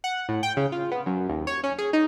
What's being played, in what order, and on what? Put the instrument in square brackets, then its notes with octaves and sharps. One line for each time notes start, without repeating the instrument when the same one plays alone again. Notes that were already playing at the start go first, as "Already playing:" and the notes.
[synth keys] F#5
A2
G5
C#3
F4
B3
F#2
D#2
C#5
C#4
G#4
D#4